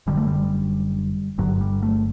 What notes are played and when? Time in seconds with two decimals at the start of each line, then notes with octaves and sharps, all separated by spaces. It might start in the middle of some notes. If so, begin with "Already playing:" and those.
0.07 F#1 F#2 D3 G3
0.17 A3
0.27 G3
1.38 G1 G2 D3 F#3
1.61 G3
1.82 A3